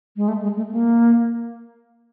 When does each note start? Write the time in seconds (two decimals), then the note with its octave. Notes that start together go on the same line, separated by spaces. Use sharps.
0.16 G#3
0.28 A3
0.42 G#3
0.57 A3
0.72 A#3